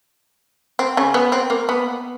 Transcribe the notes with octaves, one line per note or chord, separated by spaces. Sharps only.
C4
C#3 C#4
B3
C4
A#3
B3